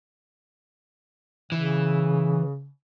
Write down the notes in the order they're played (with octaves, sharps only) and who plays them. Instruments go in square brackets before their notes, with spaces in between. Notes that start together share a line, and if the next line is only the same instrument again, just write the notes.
[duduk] C#3 [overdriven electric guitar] E3